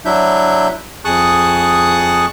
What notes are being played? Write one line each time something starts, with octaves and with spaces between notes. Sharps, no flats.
F#3 D4 E4 E5 G6
F2 G#4 A5 C#6 D#6 F#6